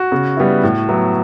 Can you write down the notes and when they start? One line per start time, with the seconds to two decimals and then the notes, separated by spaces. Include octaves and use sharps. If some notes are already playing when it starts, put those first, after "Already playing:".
Already playing: F#4
0.12 C#3
0.37 G3 B3 E4
0.63 A2
0.89 F#3 B3 E4